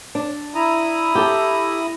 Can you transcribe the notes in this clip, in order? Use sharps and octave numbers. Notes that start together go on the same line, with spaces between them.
D4
E4 A#5 D#6
G4 A4